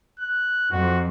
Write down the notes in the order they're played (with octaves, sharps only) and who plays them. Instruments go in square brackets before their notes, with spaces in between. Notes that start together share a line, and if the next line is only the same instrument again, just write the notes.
[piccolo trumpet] F#6
[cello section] F2 [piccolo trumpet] F#4